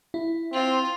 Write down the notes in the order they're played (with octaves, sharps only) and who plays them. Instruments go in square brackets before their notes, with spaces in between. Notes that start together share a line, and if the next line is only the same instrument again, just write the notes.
[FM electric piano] E4
[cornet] C4 [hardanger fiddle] F4